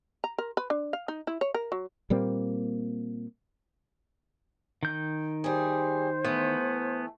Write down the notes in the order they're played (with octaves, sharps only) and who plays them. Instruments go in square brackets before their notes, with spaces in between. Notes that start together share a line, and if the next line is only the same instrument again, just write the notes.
[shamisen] A#5
A#4
B4
D4
F5
D#4
E4
C#5
A#4
F#3
[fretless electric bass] A#2 G3 A#3 C4
[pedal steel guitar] D#3 G6
[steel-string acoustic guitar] G3 G#4 [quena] C5
[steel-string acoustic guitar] E3 A3 [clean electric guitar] B3